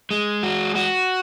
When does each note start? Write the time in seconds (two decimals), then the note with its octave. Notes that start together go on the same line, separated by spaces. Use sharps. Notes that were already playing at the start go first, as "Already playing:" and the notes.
0.11 G#3
0.43 F#4
0.75 F#4